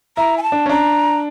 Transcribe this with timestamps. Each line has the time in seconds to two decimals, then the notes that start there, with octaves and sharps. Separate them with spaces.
0.17 E4 A#5
0.38 G#5
0.43 A5
0.52 D4
0.66 C#4
0.69 D4 A#5